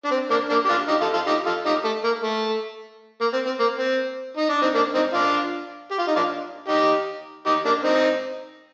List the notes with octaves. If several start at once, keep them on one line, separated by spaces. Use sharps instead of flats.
D4
C4
A#3 D4
A#3 D4
G4
D4 F4
D#4 G4
F4 A4
F4 A4
D#4 G4
F4 A4
D#4 G4
A3
A#3
A3
A#3
C4
C4
A#3
C4
D#4
D4
C4 D#4
A#3 D4
C4 D#4
D4 F4
G4
F4
D#4
D4 F4
D#4 G4
D#4 G4
A#3 D4
C4 D#4